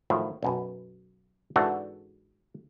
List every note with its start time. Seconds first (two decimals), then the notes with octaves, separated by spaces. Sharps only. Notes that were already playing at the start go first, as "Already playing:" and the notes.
0.10 A2 D#3 F3 F#3 A3
0.43 B1 F#2 B2
1.56 G#2 E3 D4 F#4 A4 E5